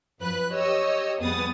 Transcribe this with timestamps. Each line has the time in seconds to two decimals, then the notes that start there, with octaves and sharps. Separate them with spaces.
0.21 F#2 F3 B4 F#6
0.52 G4 C#5 D#5 E6
1.20 F2 G3 B3 G#4 D#6 A6